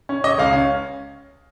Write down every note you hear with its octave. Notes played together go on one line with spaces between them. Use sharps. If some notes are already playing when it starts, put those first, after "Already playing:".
C#4
C#4 D#5
C#2 F5
C#4